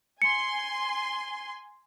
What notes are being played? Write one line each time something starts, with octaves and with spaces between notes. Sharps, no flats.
G#5 C6 C#7